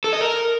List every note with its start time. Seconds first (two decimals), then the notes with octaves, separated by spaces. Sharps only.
0.04 A4
0.13 D#5
0.21 A#4